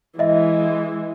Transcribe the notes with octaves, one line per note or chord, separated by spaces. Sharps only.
E3 G#3 D#5 E5